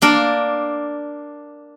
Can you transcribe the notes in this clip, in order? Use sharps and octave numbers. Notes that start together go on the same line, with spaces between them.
A#3 D4 A#4 A5